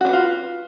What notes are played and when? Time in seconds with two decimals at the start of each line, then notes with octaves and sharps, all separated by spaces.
0.01 F#4
0.05 D4
0.09 B4
0.13 F4